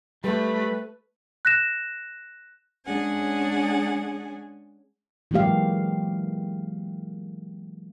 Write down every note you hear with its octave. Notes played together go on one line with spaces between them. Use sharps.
G3 A3 B4 B5
F#6 A#6 E7
G#3 C#4 D4 G#4 F#5 G#5
E3 F#3 G#3 A#3 G4 F5